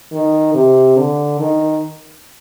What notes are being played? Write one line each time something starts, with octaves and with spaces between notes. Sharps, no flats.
D#3
C3
D3
D#3